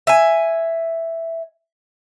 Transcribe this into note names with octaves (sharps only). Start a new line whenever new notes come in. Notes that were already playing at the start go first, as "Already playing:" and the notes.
E5 G#5